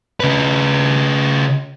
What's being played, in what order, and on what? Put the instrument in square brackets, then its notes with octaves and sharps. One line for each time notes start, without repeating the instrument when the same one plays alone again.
[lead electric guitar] C#3 B4